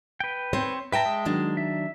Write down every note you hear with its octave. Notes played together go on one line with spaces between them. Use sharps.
B4 G5
C4 C5 C#5
B4 E5 G5 A5 A#5
G#3
D#3 F#3 D4
E5